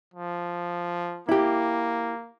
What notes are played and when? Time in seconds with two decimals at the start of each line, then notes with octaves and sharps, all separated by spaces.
0.14 F3
1.29 A#3 E4 G4